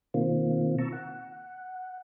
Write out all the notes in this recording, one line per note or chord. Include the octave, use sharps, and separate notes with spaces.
B2 D#3 A#3 C4 F4
A5 A#5 C#6 E6
F#5